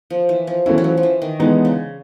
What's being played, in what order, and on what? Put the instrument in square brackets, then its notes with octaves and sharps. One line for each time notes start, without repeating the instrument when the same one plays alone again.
[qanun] F3
E3
F3
[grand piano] E3 A3 C#4 E4 [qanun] F#3
[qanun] F#3
F3
F3
E3
D#3
[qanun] D3 [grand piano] E3 G#3 B3 D#4
[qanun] C#3